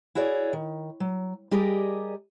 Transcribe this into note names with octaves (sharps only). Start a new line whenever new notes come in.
E4 F#4 G#4 C#5 D5
D#3
F#3
G3 G4 G#4 A#4 D5 D#5